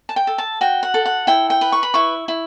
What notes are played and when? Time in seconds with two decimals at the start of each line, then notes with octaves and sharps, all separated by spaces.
0.09 A5
0.16 G5
0.27 A4
0.38 A5
0.61 F#4 G5
0.83 F#5
0.94 A4
1.06 F#5
1.27 E4 G5
1.50 G5
1.61 B4
1.72 C#6
1.83 B5
1.94 E4 C#6
2.28 E4